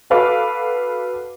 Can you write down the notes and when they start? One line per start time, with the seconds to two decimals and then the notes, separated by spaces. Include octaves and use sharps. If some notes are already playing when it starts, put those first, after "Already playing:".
0.10 F#4 A4 B4 F5 D6